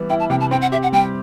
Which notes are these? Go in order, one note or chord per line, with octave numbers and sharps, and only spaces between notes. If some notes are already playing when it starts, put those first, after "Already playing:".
Already playing: E3 G3 B3
E4 G5
A5
C3 G5
A5
C4 G5
F#5
G4 E5
F#5
G3 G5